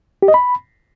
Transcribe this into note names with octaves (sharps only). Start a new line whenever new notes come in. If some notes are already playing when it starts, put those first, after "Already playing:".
G4
D#5
B5